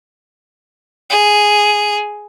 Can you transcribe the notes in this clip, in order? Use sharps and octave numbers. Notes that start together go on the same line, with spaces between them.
G#4